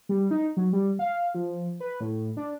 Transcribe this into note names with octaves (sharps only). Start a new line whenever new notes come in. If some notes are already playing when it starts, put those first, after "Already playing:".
G3
D#4
F#3
G3
F5
F3
B4
A2
D4